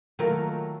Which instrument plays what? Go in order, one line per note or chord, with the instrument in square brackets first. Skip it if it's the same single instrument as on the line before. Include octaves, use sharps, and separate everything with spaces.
[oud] D#3 F4 A#4 [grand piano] F#3 A3 A#3